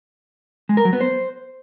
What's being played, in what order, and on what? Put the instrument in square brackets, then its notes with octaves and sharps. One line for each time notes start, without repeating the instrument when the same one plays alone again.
[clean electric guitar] G#3
A#4
F#3
B3
C5